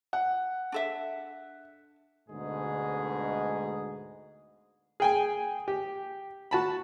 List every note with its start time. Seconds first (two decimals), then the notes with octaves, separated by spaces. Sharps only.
0.13 F#5
0.72 D4 A4 E5
2.29 D2 G#2 B2 D3 G#3 G#4
5.00 G#4 G5 G#5
5.68 G4
6.51 F#4 A5 B5